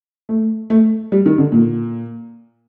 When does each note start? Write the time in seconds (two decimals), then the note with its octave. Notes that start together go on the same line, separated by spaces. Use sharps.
0.29 A3
0.70 A3
1.12 G3
1.26 D#3
1.38 D3
1.52 A#2